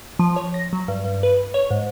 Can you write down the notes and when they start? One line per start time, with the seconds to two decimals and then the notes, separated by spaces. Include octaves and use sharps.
0.19 F3
0.36 C#5
0.54 A#6
0.73 F#3
0.88 G2
1.05 G2
1.23 B4
1.54 C#5
1.71 G#2